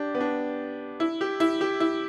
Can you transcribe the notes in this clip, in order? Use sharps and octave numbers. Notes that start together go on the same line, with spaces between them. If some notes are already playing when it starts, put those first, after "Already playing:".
Already playing: D4 G4
B3
D4
E4
G4
E4
G4
E4